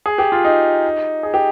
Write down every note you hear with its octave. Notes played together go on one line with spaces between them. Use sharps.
G#4
G4
F4
D#4
G#4
G4